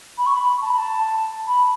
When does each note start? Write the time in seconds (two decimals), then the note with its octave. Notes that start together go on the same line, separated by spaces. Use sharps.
0.18 B5
0.26 C#6
0.34 B5
0.62 A5
0.70 B5
0.78 A5
1.47 B5